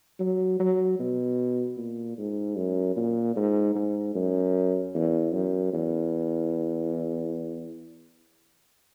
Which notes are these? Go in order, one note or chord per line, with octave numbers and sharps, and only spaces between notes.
F#3
F#3
B2
A#2
G#2
F#2
A#2
G#2
G#2
F#2
E2
F#2
E2